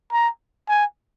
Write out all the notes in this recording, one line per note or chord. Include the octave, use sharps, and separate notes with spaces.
A#5
G#5